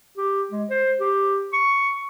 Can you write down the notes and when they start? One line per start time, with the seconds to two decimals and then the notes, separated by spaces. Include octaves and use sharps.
0.17 G4
0.51 G#3
0.70 C5
0.99 G4
1.53 C#6